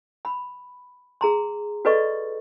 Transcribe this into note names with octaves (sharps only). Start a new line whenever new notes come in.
B5
G#4 A#5 C6
F#4 A4 B4 D5 D#5 C#6